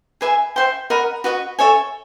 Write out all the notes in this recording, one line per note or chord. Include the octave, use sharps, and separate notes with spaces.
G#4 B4 E5 G#5
C5 E5 G5 C6
A#4 D#5 F#5 B5
F#4 B4 D#5
A4 C#5 E5 G#5